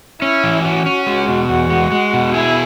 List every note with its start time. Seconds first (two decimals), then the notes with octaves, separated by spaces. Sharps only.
0.22 C#4 E4
0.43 E3
0.65 C#4 F#4
0.86 C#4
1.07 G#3
1.28 B2
1.49 E2
1.70 G#3
1.92 G#3
2.13 B2
2.34 E4 G#4